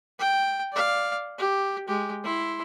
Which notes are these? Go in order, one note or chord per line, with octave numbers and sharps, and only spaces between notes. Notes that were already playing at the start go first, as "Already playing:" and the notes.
G5
D5 F5
G4
G#3 G4
E4 C6